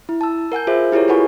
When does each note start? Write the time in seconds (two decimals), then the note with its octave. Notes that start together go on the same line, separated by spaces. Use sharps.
0.09 E4
0.21 A5 E6
0.52 A#4 F#5 G#5 G6
0.67 F4 G#4 C5 E5
0.92 E4 G4 G#4 A#4 C#5
1.08 E4 F4 B4 F#5 G#5 C#6